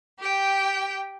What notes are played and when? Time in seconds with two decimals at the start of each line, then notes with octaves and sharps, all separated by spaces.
0.20 G4 G5